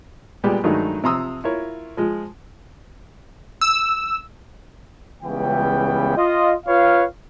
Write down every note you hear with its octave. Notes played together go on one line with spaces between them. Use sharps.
A#2 G3 G#3 B3 G4
G2 D#3 F#3 G#3 A3 D#4
C3 F3 A#5 C6 D#6 E6
E4 F4 A#4 C#5
F3 G#3
E6
C#2 C#3 E3 G3 B3 G5
F4 D#5
F4 B4 C#5 F5